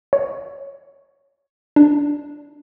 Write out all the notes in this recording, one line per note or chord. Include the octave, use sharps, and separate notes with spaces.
C#5
D4